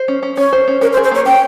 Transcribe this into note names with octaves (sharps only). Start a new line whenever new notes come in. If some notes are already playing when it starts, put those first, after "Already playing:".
Already playing: C5
C#4
C#4
C#4 C#5
C5
C#4
C#4 A#4
C5
G#4
C5
A#3 C#5
C#4 G5